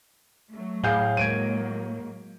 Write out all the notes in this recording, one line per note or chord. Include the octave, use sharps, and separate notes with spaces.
F#3 A3
A2 G#4 F5 G6
F#3 G#3 A#3 G#6 D7 D#7